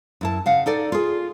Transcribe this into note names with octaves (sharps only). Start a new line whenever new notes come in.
F#2 E4 A5
C#3 F5 F#5
D#4 A4 D5
F4 G#4